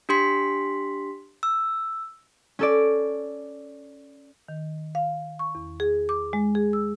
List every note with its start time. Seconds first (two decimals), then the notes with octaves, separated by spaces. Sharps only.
0.09 D4 G4 C6 B6
1.43 E6
2.59 C#4 A4 D5
4.48 D#3
4.95 F5
5.39 C#6
5.55 E2
5.80 G#4
6.09 D6
6.33 G#3
6.55 G#4
6.73 E6